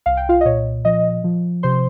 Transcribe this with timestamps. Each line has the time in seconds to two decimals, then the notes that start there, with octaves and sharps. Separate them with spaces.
0.06 C2 F5
0.17 G5
0.29 F4 F5
0.41 D#5
0.45 A#2 C#5
0.85 F3 D#5
1.24 F3
1.63 C3 C5 C6